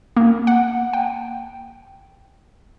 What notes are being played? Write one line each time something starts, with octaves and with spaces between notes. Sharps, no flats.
A#3
F#5
G5